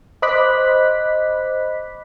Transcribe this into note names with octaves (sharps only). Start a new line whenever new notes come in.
C5 D#5 B5 D6 F#6 B6